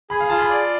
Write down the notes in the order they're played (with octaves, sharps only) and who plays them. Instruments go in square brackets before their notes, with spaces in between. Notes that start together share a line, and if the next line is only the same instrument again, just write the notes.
[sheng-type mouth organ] G#4 [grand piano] B5
[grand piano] F5
[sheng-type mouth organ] F4 [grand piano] A5
[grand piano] B5
[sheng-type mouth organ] D5